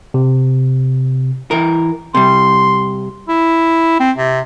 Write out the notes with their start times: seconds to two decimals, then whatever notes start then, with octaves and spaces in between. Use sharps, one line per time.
0.14 C3
1.51 E3 A#4
2.15 C3 G3 C6
3.29 E4
4.00 C4
4.17 C3